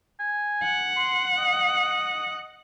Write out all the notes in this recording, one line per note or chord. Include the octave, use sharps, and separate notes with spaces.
G#5
F#5
C6
D#5